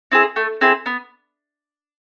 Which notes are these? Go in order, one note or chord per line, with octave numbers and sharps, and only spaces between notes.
C4 E4 G#4
A3
C4 E4 G#4
B3